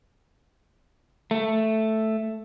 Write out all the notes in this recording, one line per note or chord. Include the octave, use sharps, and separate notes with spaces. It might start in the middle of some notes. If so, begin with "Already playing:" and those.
A3